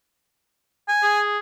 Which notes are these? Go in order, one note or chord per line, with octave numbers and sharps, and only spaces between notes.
G#5
G#4